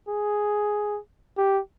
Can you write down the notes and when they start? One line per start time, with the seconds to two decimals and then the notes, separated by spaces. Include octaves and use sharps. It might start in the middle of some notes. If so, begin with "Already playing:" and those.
0.09 G#4
1.38 G4